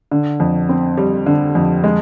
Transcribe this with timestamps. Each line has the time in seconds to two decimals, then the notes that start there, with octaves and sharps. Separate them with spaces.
0.12 D3
0.40 F2
0.69 C4
0.97 G3
1.26 D3
1.55 F2
1.84 G#3